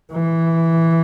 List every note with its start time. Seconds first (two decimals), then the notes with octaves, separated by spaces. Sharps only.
0.13 E3